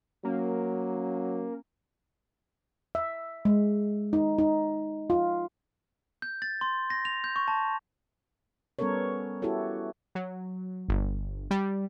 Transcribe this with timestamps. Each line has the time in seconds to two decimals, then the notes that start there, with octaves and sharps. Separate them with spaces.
0.24 F#3 A#3 C#4
2.95 E5
3.45 G#3
4.13 D#4
4.38 D#4
5.10 F4
6.22 G6
6.42 A6
6.61 C6
6.90 A#6
7.05 F7
7.24 G6
7.36 C#6
7.48 A5
8.79 G3 B3 C#4 A4 A#4 C#5
9.42 E4 F#4 G4 A4 C#5
10.15 F#3
10.89 G1
11.51 G3